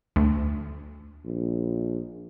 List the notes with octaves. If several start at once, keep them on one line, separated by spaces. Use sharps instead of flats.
D2
A#1